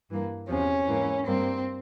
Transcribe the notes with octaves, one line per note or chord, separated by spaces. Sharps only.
G2 E3 A#3
E2 C3 F3 C#4
G#2 E3 A#3
G2 G3 A#3 C4